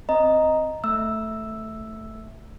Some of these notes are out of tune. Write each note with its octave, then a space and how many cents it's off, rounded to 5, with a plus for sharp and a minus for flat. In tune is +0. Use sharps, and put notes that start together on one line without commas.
C4 +0 D#5 +0 A#5 +0
A3 +0 E5 -10 E6 +0